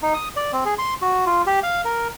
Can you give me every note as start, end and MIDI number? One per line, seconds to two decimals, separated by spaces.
0.02 0.14 63
0.14 0.28 87
0.36 0.52 74
0.53 0.64 60
0.65 0.74 68
0.78 0.94 84
1.02 1.25 66
1.26 1.42 65
1.47 1.60 67
1.63 1.81 77
1.85 2.08 70